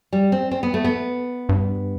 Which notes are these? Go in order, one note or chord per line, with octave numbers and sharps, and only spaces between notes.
G3
C4
C4
B3
A3
B3
G2